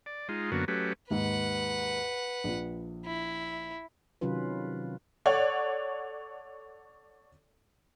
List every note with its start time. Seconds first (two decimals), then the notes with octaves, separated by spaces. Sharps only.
0.06 D5
0.29 G#3 D#4 F4
0.52 F#2 D3 A#3 B3 F#4
0.68 F#3 A3 C#4 G4 B4
1.10 D#2 G#2 B4 F#5
2.44 A#1 F3
3.06 E4
4.21 C3 D#3 F#3 C#4 F4 B4
5.26 A4 C#5 D5 F#5